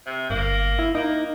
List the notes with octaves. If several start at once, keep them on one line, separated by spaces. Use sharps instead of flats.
C3
G1 A#3
E4
A#3 D#4